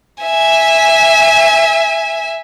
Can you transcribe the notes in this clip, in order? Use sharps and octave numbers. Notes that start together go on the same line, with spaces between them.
E5 G#5